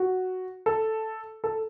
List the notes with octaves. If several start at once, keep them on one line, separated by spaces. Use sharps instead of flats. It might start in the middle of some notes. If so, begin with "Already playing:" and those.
Already playing: F#4
A4
A4